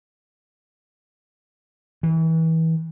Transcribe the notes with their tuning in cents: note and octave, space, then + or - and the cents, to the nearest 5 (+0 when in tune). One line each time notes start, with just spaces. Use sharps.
E3 -30